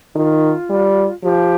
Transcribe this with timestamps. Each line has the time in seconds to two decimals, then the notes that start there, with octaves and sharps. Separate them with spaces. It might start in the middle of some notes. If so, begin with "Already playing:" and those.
0.15 D#3 F4
0.70 G3
1.23 F3 G4